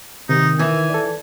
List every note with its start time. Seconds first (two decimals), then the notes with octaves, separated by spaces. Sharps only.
0.29 C3 D#3 D#4
0.59 E3 G#5 E6
0.90 A4 D5